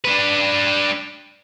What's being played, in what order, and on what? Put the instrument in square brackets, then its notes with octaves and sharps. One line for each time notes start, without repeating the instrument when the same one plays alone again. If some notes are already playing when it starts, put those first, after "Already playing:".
[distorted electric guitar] D4 B4